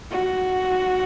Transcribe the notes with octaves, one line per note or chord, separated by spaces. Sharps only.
F#4